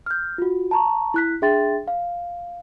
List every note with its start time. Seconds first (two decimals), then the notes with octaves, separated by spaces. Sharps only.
0.06 F6 G6
0.38 F4 F#4
0.71 A5 A#5 C#6
1.14 E4 F#6 B6
1.42 D4 G#4 E5 G5 C6 A6
1.88 F5